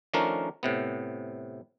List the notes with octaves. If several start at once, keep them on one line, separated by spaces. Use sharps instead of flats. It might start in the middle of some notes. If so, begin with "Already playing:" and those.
D#3 F3 A3 C#4 D4 A#4
A2 C3 B3